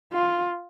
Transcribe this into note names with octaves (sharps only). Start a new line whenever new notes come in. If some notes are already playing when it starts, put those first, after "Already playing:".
F4